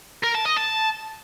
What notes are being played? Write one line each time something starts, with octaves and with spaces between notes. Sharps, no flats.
A#4
A5
D#5
A5